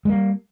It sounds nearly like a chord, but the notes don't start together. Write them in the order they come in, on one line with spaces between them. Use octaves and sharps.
G#3 A#3 G3